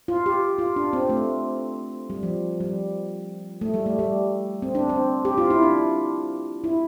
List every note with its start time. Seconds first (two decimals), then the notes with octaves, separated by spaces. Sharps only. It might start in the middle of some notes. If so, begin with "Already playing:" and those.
0.08 F4
0.26 G4
0.58 F4
0.76 D4
0.93 C4
1.09 A3
2.10 G3
2.23 F3
2.60 G3
3.61 A3
3.74 G3
3.86 A3
3.99 G3
4.62 C4
4.75 D4
4.89 C4
5.25 G4
5.38 F4
5.50 E4
5.63 D4
6.64 E4